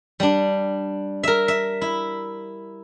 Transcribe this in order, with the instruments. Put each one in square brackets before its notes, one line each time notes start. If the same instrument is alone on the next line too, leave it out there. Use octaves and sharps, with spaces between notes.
[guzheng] G3 D4
A#4 E5
E5
E4